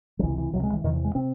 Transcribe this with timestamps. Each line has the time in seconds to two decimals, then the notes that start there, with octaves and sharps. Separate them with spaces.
0.19 F#3
0.23 C#2 C3 E3
0.38 E3
0.53 C#2 C3 F#3
0.63 G#3
0.73 E3
0.84 E2 C3 D#3
0.94 E3
1.04 G#3
1.15 C3 C4